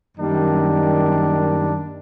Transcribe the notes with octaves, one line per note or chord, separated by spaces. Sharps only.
F#2 D#3 G3 A#3 D4